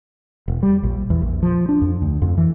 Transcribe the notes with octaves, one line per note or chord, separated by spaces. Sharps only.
E1
G3
A#1
E2
A#1
F3
D4
F2
D2
F2
E3